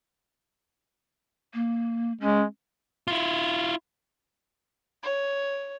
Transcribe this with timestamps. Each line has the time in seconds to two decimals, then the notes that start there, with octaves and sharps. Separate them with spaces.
1.54 A#3
2.21 G#3 C#4
3.08 E4 F4
5.03 C#5